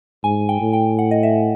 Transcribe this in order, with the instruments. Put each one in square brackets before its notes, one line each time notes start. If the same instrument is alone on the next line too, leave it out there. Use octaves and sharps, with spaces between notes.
[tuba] G#2 [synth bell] G#5
[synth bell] G5
[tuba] A2
[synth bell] G5
F#5
D#5
E5